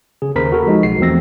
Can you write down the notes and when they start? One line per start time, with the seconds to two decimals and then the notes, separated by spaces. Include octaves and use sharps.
0.22 C#3 G#4
0.36 D#2 C#3 A#4 C5 B5 B6
0.52 F#4 A4 A#4
0.67 F3 G#3 D#4
0.83 B1 F#4 C7
0.99 E2 F3 A3 C4 E6 A#6